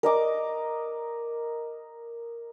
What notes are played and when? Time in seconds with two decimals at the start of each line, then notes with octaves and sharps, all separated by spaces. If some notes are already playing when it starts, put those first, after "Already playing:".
0.03 A#4 D#5 D6